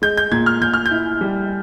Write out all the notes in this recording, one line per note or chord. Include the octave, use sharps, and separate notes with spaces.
G#3 G6
G6
A#2 G#6
F6
A#2 G6
F6
G6
E4
G3